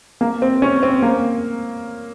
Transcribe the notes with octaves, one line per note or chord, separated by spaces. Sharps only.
A#3
C4
C#4
C4
A#3